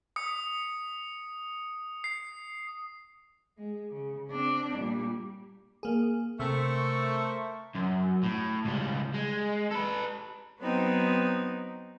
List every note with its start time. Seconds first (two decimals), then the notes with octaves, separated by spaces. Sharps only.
0.16 D#6 C#7
2.04 C7
3.57 G#3
3.89 C#3
4.29 C4 D4
4.76 A#2 G3
5.83 A#3 G#4
6.40 C3 A3 A#4 C5 C#6 E6
7.75 F#2
8.23 A2
8.64 C#2 G3
9.14 G#3
9.71 A4 B4
10.60 F#3 B3 C4 D#4